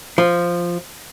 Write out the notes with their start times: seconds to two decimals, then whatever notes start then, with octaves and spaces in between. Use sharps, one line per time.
0.18 F3